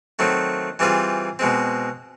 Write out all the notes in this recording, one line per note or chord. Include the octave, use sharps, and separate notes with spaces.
D#3 F#3 A3 C4
E3 G3 C4 F4 G#4
B2 G#3 C4